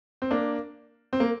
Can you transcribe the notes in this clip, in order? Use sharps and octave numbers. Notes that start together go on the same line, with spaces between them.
C4
A#3 D4
C4
A#3